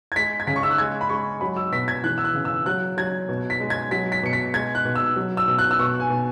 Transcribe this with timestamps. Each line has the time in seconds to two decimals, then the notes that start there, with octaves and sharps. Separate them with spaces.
0.12 G#6
0.16 G#3 B6
0.40 G#6
0.47 C#3 B6
0.56 C#6
0.63 E6
0.71 F#6
0.78 G#3 G#6
1.01 B5
1.09 G#3 C#6
1.41 F#3 B5
1.57 E6
1.72 B2 B6
1.88 G#6
2.04 E3 F#6
2.18 E6
2.24 F#6
2.35 C#3
2.45 E6
2.66 F#3 F#6
2.97 F#3 G#6
3.29 B2
3.50 B6
3.60 G#3
3.70 G#6
3.91 F#3 B6
4.12 B6
4.23 B2 C#7
4.33 B6
4.54 G#3 G#6
4.75 F#6
4.85 B2
4.95 E6
5.16 F#3
5.37 E6
5.48 B2
5.58 F#6
5.71 E6
5.79 B2 C#6
6.00 G#5
6.10 B2